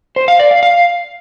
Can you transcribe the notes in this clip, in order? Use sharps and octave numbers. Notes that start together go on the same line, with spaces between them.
C5
F5
D5
F5
F5